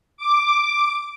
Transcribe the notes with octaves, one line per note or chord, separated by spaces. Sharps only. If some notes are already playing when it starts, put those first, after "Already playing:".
D6